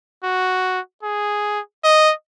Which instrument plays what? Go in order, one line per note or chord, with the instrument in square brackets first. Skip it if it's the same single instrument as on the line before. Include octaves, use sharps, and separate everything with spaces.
[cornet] F#4
G#4
D#5